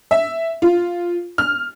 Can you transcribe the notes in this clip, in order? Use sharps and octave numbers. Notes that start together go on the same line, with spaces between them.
E5
F4
F6